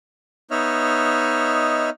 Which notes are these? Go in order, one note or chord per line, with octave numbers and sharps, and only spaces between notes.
B3 D#4 C#5 D#5 E5 F6